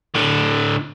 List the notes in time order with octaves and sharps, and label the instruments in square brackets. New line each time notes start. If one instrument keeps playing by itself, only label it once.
[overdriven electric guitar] A2 D3